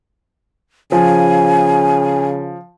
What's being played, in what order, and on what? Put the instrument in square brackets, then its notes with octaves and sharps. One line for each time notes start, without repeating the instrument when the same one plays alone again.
[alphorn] C#3 [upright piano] F3 [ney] G#5